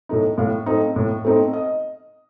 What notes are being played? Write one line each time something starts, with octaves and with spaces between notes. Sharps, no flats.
A2 A3 D#4
A2 F5
A3 C4 D#4
A2
A3 C4 D#4
D#5